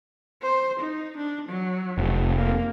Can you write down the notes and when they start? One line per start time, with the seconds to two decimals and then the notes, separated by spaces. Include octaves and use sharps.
0.42 C5
0.80 D#4
1.17 D4
1.49 F#3
1.98 F1
2.37 A#3